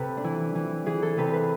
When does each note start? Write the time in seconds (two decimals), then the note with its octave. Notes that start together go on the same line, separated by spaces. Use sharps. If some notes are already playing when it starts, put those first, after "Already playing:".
Already playing: C3 A4 B4
0.17 D4
0.24 E3 E4
0.55 E3
0.86 E3 G#4
1.02 A4
1.18 C3 B4
1.33 B4